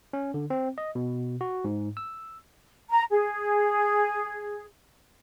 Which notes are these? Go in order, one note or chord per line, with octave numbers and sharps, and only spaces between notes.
C#4
D3
C4
D#5
B2
F#4
G#2
E6
A#5
G#4